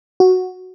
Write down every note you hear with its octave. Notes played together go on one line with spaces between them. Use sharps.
F#4